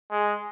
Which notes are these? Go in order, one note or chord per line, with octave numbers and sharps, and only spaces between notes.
G#3